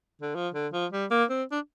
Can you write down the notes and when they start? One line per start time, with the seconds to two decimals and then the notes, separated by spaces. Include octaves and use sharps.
0.22 D3
0.35 F3
0.54 D3
0.73 F3
0.92 G3
1.11 A#3
1.30 C4
1.52 D4